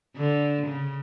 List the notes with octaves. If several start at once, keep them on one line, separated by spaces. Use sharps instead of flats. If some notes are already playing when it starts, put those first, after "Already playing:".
D3
C#3